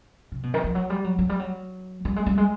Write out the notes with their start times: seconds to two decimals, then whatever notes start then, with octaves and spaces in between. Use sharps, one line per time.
0.32 C3
0.43 B2
0.54 D#3
0.64 F3
0.75 F#3
0.90 G3
1.04 F#3
1.19 F#3
1.29 G3
1.39 F#3
2.05 G3
2.16 G#3
2.26 G3
2.38 G#3